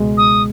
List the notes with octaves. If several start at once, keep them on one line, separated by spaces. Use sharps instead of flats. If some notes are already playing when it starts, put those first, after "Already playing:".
Already playing: C#2 B2 G#3
D#6